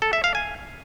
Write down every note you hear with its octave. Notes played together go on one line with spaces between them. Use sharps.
A4
E5
F5
G#5